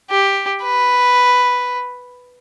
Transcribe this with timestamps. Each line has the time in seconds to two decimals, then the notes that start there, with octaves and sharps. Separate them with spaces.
0.10 G4
0.63 B4